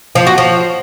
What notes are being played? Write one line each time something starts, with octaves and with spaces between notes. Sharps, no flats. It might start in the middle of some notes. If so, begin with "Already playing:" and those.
F3
F#4
F3